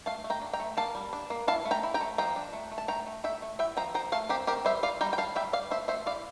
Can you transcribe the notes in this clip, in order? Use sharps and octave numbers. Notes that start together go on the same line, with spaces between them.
A3 F5 A5
A3
G5 A#5
D4
G5 A#5
A3
A#3 F5 A5
G3
D4
A#3
E4 F5 A5
A3
G5 A#5
E4
G5 A#5
A3
F3 G5 A#5
D4
A3
A3
A5
A3 G5 A#5
A3
A3 E5 G5
A3
E4 E5 G5
F3 G5 A#5
F3 G5 A#5
A3 F5 A5
C4 G4 A#4
C4 G4 A#4
G3 C5 E5
F4 D5 F5
G3 G5 A#5
G5
G3 F5 A5
G3 E5 G5
G3 D5 F5
A3 C5 E5
A3 C5 E5
E4 D5 F5